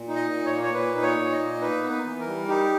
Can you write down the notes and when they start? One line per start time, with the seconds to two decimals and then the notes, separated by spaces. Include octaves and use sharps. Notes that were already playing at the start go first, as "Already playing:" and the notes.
Already playing: A#2
0.08 D#4
0.16 D#5
0.31 A#2
0.45 C#5
0.52 A#3
0.63 C#5
0.73 A#2 B4
0.96 D#4
1.03 C#5
1.18 A#2
1.32 D#5
1.39 A#3
1.61 D#4 B4
1.83 B3
1.90 B4
2.05 E3
2.20 A#4
2.27 G3
2.48 D#4 G4